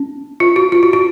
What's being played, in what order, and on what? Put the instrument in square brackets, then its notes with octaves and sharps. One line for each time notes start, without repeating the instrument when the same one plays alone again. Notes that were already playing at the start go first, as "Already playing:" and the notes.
Already playing: [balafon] C#4
F4
F#4
F4
F#4
F#4